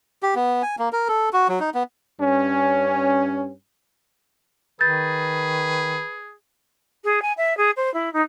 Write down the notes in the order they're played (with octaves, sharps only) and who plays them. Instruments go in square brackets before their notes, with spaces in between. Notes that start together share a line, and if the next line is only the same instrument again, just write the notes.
[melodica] G4
B3
G#5
A#3
A#4
A4
F#4
F#3
D#4
B3
[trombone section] G2 C#4
[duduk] D#3 [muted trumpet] G#4 [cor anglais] B4 [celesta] G6 A6
[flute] G#4
G#5
E5
G#4
C5
E4
D#4